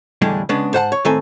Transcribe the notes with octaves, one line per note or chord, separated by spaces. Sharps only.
E2 A2 D3 G3 G#3 D4
C#3 G#3 B3 D4
G#2 C5 F#5 A5
C#5
A2 D#3 A3 C4 A4 G#5